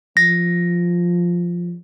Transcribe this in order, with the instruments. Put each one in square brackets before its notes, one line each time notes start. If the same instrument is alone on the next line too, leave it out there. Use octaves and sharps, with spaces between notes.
[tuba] F3 [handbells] A#6